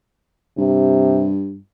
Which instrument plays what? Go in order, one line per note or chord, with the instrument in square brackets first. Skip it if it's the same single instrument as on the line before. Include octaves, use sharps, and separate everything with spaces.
[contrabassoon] G2 [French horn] C3